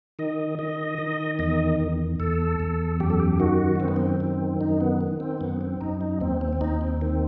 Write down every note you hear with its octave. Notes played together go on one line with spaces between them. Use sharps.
D#3 D#5
D#3 D#5
D#3
E2 D#5
E2
E2 A4
E2
F#2 G4
A4
G4
D#3 F#4
F#2 C4
B3
C4
D#3
F#2 D#4
B3
D#3
C4
F#2 B3
C4
F#2 D#4
D#4
D#2 C4
C4
C4
D#2 D#4
C4
D#3 C4